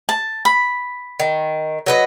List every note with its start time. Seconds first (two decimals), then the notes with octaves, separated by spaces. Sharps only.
0.09 A5
0.45 B5
1.20 D#3
1.86 F#3 B4 D#5